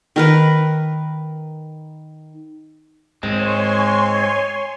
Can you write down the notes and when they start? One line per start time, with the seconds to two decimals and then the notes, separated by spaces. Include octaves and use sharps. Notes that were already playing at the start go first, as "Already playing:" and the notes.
0.16 D#3 A#4 B4
3.23 G#2 G#3 C4 C#5 G#5 C6